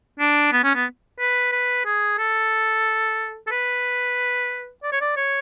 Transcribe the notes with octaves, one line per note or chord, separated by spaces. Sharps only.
D4
B3
C#4
B3
B4
B4
G#4
A4
A4
B4
D5
C#5
D5
C#5